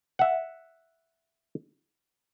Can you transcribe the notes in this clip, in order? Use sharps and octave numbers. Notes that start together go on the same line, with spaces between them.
E5 F#5